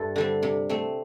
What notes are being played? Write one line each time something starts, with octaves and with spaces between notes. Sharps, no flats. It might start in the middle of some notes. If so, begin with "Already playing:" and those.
Already playing: G2 E4 A4
D3 G3 C4
C3
A3 C4